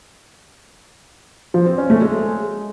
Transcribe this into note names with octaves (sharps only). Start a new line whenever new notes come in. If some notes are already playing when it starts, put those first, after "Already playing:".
F3
C4
C#4
A3
G#3